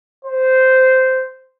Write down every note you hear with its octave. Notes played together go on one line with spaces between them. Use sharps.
C5